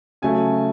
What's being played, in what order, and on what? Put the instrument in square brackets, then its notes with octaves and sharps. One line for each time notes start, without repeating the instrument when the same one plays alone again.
[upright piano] C#3 F#3 A3 G#5